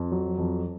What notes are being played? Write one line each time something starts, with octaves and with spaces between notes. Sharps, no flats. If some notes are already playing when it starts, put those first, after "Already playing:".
Already playing: F2
F#3
F2